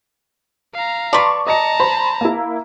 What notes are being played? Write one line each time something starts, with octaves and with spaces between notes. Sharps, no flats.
F5 A#5
B4 D5 A5 C6 C#6
D#5 A5 A#5 A#6 C#7
C5 B5
A#3 E4